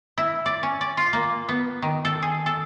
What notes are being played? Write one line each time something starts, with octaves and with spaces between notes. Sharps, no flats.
E4
D5
C#4
D5
F4
A#3
B3
D#3
A4
G#4
A4